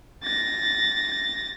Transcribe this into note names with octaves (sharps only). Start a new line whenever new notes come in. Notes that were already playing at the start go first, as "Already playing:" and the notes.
A6 A#6